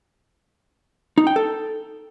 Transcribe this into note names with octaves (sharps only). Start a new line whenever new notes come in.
D#4
G5
A4